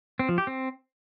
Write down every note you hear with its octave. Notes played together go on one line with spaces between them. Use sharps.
C4
F3
G4
C4